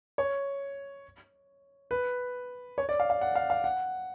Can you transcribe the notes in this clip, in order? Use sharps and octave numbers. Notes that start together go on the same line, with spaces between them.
C#5
B4
C#5
D5
F5
F5
F#5
F5
F5
F#5